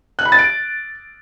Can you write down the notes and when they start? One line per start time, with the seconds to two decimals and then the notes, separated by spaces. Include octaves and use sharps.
0.19 F#6
0.25 B5
0.32 A6
0.39 D7